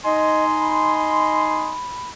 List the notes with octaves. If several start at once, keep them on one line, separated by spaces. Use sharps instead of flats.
D#4 D#5 G#5 C6
B5